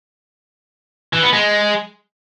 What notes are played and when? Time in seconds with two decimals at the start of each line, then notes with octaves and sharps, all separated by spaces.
1.13 E3
1.23 B3
1.33 G#3